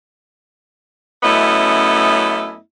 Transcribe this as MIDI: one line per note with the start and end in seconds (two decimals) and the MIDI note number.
1.23 2.57 42
1.23 2.57 57
1.23 2.57 59
1.23 2.57 61
1.23 2.57 64
1.23 2.57 75